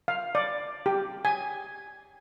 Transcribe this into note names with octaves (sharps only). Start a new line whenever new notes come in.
F5
D5
G4
G#5